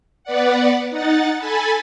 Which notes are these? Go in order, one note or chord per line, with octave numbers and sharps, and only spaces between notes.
B3 B4 D5 F#5
D#4 F#5 A6
A4 G#5 A5 B5